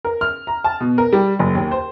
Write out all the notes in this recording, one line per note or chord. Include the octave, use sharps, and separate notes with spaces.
A#4
F6
A#5
A5
B2
A#4
G3
F#1
D#2
C5